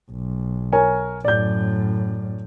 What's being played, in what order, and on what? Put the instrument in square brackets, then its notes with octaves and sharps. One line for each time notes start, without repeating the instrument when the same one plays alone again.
[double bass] B1
[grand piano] A#4 C#5 G#5
[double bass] F#2 A2 [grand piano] D5 G6